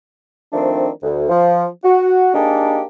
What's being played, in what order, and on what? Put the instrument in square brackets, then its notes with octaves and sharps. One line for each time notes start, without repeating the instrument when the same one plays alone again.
[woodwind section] D#3 F3 A3 C4 D4
D2
F3
F#4
A#3 D4 D#4 G4 G#4 A5